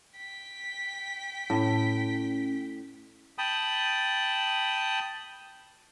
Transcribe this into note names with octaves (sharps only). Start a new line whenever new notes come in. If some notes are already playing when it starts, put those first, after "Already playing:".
G5 B6
A2 C#4
G5 A5 B5 D#6